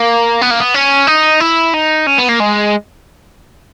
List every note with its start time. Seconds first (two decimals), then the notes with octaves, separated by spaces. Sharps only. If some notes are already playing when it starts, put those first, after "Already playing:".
Already playing: A#3
0.41 B3
0.51 A#3
0.60 B3
0.74 C#4
1.07 D#4
1.40 E4
1.74 D#4
2.07 C#4
2.18 B3
2.28 A#3
2.40 G#3